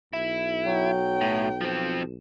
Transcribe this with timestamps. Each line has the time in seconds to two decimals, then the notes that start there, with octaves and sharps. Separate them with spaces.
0.13 B1 E4
0.66 F#3 G5
1.21 A2
1.61 F3 C4